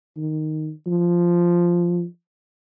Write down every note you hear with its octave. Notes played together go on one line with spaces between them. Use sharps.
D#3
F3